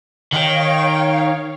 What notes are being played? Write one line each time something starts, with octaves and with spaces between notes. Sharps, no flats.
D#3 C#5 F5 G5